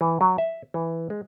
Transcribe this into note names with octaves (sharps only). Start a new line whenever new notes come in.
E3
F#3
E5
E3
G#3